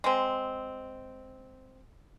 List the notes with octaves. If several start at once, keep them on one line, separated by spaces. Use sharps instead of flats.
G#3 C4